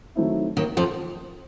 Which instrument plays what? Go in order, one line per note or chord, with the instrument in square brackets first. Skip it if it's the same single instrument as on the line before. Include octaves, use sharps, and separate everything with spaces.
[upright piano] D#3 F#3 A3 C4 E4
[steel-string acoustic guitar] D#2 D#3
F2 F3